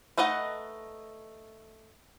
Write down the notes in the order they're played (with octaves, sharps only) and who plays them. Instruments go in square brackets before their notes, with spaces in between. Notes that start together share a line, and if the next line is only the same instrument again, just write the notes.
[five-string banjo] A3 D#4 B4 D#5 F#5